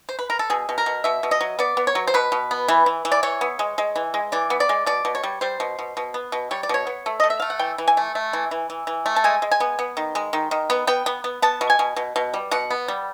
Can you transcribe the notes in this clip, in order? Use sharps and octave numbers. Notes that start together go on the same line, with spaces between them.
C5
B4
A#4
A4
B2 G#4
B2
A#4
B2
B2 E5
B2
D#5
F#3
B3 D5
B3
C#5
F#3
C5
B2 B4
B2
B3
E3
E3
E3
D5
E3 C#5
B3
G#3
G#3
E3
G#3
E3 D5
B3
D5
G#3
B2 D5
B2
C#5
G3
G3 C5
B2
B2
B2
B3
B2
G3 C#5
D5
B2 C#5
B3
A3
A3 D#5
E5
A3 F5
F#5
E3 G5
E3
G#5
A3
A3
E3
E3
E3
E3
A3
A5
G#3 G#5
G#3
G#5
B3
B3
D#3
G#3
D#3
D#3
B3
B3 G5
B3
B3
B3 A5
B2
G#5
B2
B2
B2
G3
B2 F#5
B3
G3